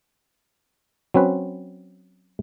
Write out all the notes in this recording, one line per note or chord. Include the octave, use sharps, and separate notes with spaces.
F#3 C4 C#4 B4